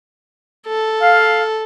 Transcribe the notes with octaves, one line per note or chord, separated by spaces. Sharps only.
A4
F5